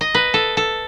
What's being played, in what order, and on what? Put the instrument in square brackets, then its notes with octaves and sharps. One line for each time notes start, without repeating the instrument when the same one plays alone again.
[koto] D#5
B4
A4
A4